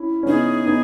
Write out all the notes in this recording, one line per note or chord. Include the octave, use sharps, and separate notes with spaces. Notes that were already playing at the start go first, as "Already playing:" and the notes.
Already playing: C#4 E4
C#4
B3 D#4 G#4
B3 D#4